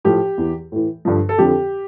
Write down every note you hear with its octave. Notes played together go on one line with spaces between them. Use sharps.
A2 F3 G4
E2 E3
A2 E3
G2 D3 F3
A4
F2 D3 F3 G4